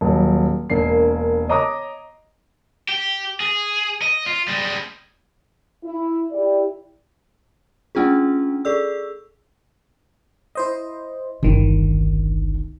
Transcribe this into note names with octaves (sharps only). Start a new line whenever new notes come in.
D#1 F#3
E1 A#3 C7
C#5 D#5 A#5 D6 D#6
G4
G#4
D#5
F4
G3 G#3
E4
E4 G4 D5
A3 C#4 D4 F4 G#4
G#4 A4 D5 E6
E4 C5 D#5
G1 C2 D#3 E3 D4